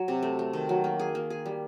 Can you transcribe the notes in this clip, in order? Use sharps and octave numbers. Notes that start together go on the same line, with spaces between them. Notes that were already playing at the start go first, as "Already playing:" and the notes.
Already playing: F#3
C3
A3
A3
D#3
F#3
A#3
G#4
A#3
G#4
G3